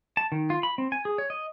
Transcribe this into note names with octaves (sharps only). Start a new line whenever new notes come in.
A5
D#3
F4
B5
C4
G#5
G#4
C#5
D#5